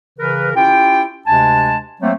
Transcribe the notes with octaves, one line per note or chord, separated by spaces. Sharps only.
C#3 E3 A#4 B4
C#4 E4 F4 G4 G5
D2 C3 G#3 D4 G#5 A5
F#3 A3 A#3 C4